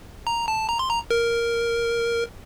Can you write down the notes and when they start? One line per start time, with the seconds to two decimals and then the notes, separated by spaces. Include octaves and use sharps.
0.27 A#5
0.48 A5
0.69 A#5
0.79 C6
0.90 A#5
1.11 A#4